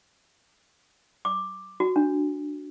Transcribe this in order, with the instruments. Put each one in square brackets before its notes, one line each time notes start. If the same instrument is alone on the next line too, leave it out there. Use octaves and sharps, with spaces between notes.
[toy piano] D6
F#4
D4